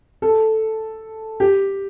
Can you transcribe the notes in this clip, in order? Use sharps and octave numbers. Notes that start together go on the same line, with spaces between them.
A4
G4